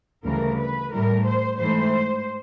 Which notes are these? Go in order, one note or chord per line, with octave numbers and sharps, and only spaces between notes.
D2 C#3 E3 G3 A#4
B4
A2 E3 G3 A#4
C5
G#2 E3 A3 C5